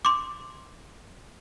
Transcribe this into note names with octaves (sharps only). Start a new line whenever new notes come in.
C6 D6